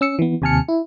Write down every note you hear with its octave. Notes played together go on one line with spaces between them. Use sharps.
C#4 E6 C#7
E3 B3
D#2 C3 G#5 A5 F6 C#7
E4